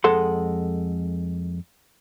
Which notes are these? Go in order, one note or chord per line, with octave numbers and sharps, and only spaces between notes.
F2 G#3 A4 F#5 C6